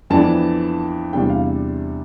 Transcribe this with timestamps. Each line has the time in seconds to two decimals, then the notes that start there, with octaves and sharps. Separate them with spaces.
0.10 F2 E3 B3 D4 A5
1.13 E2 C3 G3 D4 G5
1.30 F5